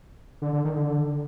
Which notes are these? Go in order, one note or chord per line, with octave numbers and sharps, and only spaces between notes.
D3
D3
D#3
D3